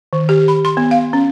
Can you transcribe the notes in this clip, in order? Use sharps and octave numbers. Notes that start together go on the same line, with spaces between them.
D#3
G4
B5
C6
B3
F5
C#4